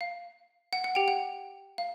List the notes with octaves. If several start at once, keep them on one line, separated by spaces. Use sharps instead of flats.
F5
F#5
F#5
G4 G5
F#5
F5